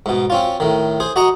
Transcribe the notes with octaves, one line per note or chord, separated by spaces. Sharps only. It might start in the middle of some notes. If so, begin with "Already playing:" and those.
G#2 B2
C4 C#4 F4
A2 D#3
G#4 C5
F#4 D#5 A#5 C#6 D#6